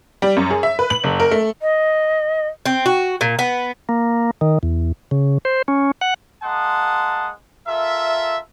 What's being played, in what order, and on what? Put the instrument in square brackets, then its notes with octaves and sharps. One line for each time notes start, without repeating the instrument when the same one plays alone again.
[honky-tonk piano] G3
F#2
G#4
E5
B4
F#7
F#1
A#4
A3
[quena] D#5
[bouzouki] C4
F#4
A#2
B3
[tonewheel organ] A#3
D#3
E2
C#3
C5
C#4
F#5
[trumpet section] G#3 A#3 F#5 A5 C6 D#6
F4 A4 A#4 E5